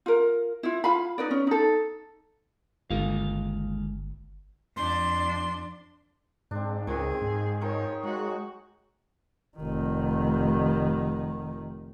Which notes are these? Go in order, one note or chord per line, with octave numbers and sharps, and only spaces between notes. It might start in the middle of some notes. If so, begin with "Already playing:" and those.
F4 A#4
E4 F4
F4 F5 B5
D#4 B4 D5
C#4
D#4 A4
G1 D#2 G#3 F5
F2 D4 C6
G#2 C4 D4
C#2 D#3 C4 G#4
G#2
D#3 F3 D#4 C#5
F#3 G#3 F#4
F1 D#3